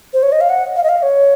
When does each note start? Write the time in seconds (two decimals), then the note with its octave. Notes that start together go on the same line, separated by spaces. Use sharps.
0.14 C5
0.23 C#5
0.32 D#5
0.41 F5
0.50 F#5
0.76 F5
0.84 D#5
0.89 F5
1.02 C#5